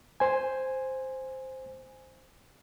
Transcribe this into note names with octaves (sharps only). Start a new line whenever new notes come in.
C5 G#5